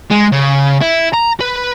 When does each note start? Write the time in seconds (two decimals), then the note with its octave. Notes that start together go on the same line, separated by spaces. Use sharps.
0.11 G#3
0.33 C#3
0.81 E4
1.13 A#5
1.40 B4